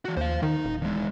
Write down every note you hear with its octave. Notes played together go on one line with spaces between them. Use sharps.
E3 F#4
D#2 C5 F5
D#3 D#4
D#1
E2 G#3